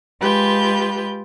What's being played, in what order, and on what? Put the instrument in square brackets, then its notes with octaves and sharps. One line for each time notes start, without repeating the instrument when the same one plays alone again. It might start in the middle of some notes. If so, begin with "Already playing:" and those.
[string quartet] G#3 F4 G4 B4 G6